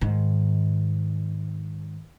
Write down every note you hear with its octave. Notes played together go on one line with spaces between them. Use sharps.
G#2 D#3